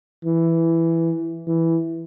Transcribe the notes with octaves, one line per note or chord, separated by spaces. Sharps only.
E3
E3